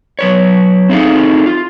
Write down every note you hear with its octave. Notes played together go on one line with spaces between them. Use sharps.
F#3 B4 C#5
C4 D#4 E4 G#4 A4 F5
F4